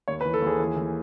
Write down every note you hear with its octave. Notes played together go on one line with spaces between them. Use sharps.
D#2 C#5
B4
E3
A4
D#2
G#4
E3
E3